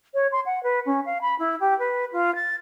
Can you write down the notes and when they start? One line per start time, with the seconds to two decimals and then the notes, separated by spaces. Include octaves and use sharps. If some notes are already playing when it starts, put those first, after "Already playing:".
0.14 C#5
0.32 C6
0.45 F#5
0.63 B4
0.86 C#4
1.05 F5
1.21 B5
1.39 E4
1.60 G4
1.78 B4
2.12 F4
2.35 A6